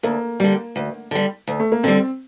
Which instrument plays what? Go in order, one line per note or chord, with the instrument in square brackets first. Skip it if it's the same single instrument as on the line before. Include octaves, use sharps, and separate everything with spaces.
[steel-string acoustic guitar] D2 [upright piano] A#3
[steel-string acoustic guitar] D3 G3
D2
D3 G3
D2
[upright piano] A3
A#3
[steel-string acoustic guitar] D3 G3 [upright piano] C4